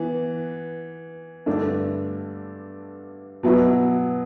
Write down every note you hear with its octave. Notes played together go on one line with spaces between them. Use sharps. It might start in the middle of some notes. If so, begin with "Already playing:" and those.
Already playing: E3 B3
G2 D3 A3 D4
B2 F#3 B3 E4